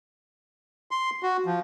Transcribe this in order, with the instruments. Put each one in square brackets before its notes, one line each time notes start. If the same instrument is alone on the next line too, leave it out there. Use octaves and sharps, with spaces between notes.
[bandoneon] C6
F#4
F3